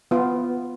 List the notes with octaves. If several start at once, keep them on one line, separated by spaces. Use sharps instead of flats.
B3 F4